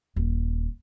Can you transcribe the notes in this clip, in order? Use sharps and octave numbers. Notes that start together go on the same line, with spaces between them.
D#1